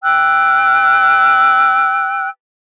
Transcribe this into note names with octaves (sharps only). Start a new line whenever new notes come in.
G5 E6 F#6